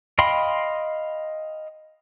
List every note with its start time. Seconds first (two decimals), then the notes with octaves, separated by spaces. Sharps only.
0.19 D#5 F5 G5 B5 C6